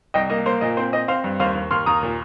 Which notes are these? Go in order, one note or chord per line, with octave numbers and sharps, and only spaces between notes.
C2 D#5 G5
A#3 D#5
A#3 C5
A#2 D#5
C4 C5
C4 D#5
C4 C5 F5
G2
D#2 C5 F5
D#2
D#2 C6 F6
D#2 A#5 D#6
A#2